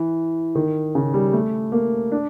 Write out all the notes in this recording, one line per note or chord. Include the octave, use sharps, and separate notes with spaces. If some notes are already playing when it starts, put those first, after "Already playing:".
Already playing: E3
D#3
C#3
G3
A3
A#3
D4